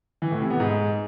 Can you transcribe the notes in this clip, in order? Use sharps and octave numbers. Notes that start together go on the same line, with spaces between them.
E3
A2
C3
B3
G#2